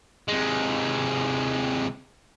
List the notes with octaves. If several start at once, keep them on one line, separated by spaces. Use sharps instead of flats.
C3 G#3